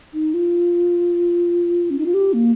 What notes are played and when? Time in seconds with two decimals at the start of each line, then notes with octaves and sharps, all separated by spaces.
0.14 D#4
0.34 F4
1.90 C#4
1.99 D#4
2.06 F4
2.14 G4
2.33 A#3